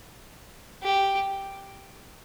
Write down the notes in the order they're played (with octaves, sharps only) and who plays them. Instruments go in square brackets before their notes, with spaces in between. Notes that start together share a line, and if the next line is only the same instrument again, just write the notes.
[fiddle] G4